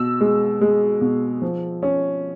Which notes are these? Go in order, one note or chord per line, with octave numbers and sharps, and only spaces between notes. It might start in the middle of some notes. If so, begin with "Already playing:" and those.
Already playing: B2 E6
G#3
G#3
B2
F3
C#4